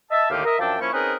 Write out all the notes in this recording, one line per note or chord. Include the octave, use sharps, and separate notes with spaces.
D#5 E5 A5
D#2 A2 D3 D#3 G4 F5
A#4 D#5 E5
F#2 F3 D4 E5 G5 A5
F3 A#3 C#4 E4 C#6
C4 C#4 D#4 G#4 A#4 B4